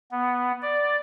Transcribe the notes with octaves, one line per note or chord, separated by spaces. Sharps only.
B3
D5